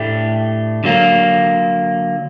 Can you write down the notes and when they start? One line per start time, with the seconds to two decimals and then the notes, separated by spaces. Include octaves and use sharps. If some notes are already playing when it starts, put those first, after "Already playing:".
Already playing: A2 A3 D4 G4
0.84 D3 F#3 A#3